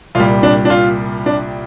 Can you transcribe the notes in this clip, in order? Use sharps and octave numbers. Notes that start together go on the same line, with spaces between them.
C2 A#2 G3 F4
D4
D4
F4
D4